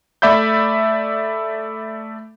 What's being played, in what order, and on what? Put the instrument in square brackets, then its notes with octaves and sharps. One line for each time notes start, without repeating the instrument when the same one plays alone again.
[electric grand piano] A3 D5 E5 B5 G6